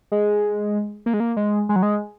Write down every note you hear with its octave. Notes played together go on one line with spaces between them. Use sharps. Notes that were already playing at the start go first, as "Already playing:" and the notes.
G#3
A#3
G#3
A#3
G#3
G#3
F#3
G#3